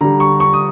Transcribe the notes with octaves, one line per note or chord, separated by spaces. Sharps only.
D3 G3 A#5
C#6
C#6
D#6